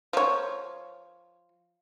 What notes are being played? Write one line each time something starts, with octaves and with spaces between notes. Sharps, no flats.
F3 C#5